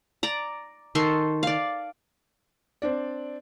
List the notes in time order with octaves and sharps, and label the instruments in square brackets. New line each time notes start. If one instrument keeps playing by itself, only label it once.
[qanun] D5 A#5
D#3 A4 C6 C#6
D5 F5
[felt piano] C4 D4 D5